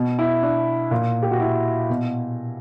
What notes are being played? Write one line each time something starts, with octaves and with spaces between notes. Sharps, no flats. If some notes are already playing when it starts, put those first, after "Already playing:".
Already playing: B2
E4
D4
A#2
G4
F#4
E4
B2